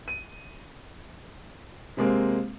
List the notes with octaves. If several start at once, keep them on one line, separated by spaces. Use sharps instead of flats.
D#7
C3 G#3 A#3 C4